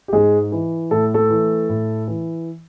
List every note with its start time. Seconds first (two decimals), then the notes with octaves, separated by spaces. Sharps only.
0.08 G4
0.13 G#2 G#3 G#4
0.52 E3
0.91 A2 A4
1.14 A3 A4
1.30 E3
1.69 A2
2.08 E3